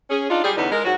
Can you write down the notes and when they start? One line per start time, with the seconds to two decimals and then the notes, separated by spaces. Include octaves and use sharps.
0.10 C#4 G#4
0.29 D4 D#4 F4
0.44 G3 G#4
0.57 E2 D3 B3 C#4 D#4
0.71 G#3 A#4
0.84 G#2 F#3 F#4